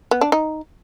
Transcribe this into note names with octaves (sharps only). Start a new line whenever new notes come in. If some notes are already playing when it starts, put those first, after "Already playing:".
B3
D4
D#4